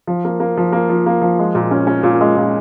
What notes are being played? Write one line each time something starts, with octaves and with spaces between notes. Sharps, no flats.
F3
A#3
A#3
F3
A#3
F3
A#3
F3
G#3
A#2
C#4
C#4
A#2
G#3
A#2